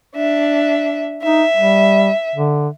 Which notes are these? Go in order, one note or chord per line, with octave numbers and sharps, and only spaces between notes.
D4 E5
D#4 E5
G3
D3